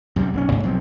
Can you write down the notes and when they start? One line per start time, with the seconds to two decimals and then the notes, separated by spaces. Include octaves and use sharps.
0.16 F#2 C3 G3
0.34 B1 E3 C#4
0.52 G#2
0.64 B1 F3 F#3 C4